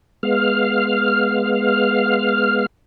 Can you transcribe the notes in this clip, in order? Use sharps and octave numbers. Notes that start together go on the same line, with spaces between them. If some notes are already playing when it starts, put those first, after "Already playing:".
G#3 B3 F5 F6